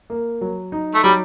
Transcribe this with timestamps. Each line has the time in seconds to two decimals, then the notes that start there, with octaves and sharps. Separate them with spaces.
0.10 A#3
0.41 F#3
0.72 D#4
0.95 A3
1.04 F#3 G3